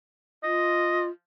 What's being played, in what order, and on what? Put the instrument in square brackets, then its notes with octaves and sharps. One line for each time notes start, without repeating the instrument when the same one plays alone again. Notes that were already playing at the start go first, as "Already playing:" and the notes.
[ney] F4 [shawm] D#5